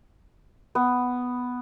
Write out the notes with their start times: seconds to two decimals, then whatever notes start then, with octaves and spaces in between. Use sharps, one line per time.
0.75 B3